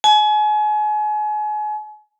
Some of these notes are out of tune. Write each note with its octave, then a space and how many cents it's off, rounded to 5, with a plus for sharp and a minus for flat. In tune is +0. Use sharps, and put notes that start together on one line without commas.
G#5 +35